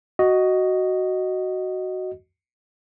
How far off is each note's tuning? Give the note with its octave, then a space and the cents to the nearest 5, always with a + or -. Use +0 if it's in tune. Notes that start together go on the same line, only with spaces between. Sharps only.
F#4 +5 D#5 +0